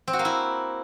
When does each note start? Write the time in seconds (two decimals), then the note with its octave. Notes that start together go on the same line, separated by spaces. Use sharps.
0.08 C4
0.13 F#4
0.19 A#3
0.25 E4